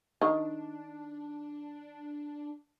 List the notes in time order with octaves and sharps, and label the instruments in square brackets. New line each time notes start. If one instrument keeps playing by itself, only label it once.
[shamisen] D#3 [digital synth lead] D4